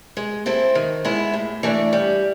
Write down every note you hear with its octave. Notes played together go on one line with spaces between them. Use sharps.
G#3
C4 E4 A4 C5
D#3
G#3 B3 E4
A2
E3 A3 D4
G3